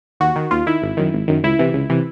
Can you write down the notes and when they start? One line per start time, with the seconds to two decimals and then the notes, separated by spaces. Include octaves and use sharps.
0.20 D#2 F#4
0.36 D#3
0.51 D#2 F4
0.66 D#3 E4
0.82 G#1
0.97 F#2 D#3
1.13 G#1
1.28 F#2 D#3
1.43 C#2 E4
1.59 C3 E3
1.74 C#2
1.89 C3 E3